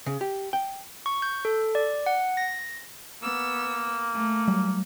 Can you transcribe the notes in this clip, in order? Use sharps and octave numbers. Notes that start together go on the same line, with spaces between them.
C#3
G4
G5
C#6
G6
A4
D5
F#5
A#6
A#3 B3 E6
A3
F#3 G3